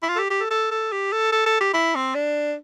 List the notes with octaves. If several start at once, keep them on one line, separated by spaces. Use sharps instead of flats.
E4
F4
A4
G4
G4
A4
A4
A4
G4
A4
A4
A4
G4
E4
C4
D4